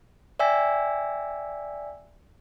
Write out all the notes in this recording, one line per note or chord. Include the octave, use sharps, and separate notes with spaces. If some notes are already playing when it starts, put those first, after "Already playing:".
D5 E5 G5 G#5 E6 B6